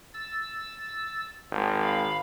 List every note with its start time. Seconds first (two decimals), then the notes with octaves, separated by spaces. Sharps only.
0.14 E6 A6
1.52 G#1
1.81 F5 B5